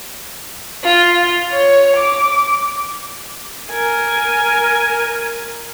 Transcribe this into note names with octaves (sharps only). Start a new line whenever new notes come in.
F4
C#5
D6
A#4 G#5